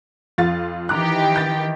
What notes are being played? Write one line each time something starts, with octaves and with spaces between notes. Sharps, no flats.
F2 F4 A6
D#3 E3 G4 A#5 D6 F#6
G6 A6